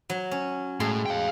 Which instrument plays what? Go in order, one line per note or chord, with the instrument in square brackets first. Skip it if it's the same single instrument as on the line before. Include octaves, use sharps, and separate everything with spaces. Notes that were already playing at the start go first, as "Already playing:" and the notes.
[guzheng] F#3
C#4
[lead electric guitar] A2 [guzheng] G#3 C6
[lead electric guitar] F5 G5